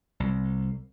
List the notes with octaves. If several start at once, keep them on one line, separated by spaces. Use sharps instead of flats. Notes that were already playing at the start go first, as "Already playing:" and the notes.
C2